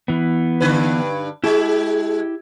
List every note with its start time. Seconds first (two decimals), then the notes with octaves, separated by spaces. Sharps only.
0.08 E3 B3
0.60 G2 D3 B4
1.44 G#3 E4 G4